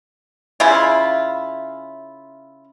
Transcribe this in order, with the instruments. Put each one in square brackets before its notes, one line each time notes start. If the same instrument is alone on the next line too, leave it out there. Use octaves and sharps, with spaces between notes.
[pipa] C#3 E4 F4